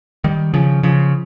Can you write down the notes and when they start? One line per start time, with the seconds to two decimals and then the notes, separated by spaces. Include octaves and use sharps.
0.24 D#3 G3
0.54 C#3 F3
0.83 C#3 F3